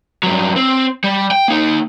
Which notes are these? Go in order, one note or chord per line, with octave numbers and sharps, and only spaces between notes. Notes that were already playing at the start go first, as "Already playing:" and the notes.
G2 F#3
C4
G3
G5
A#3 D#4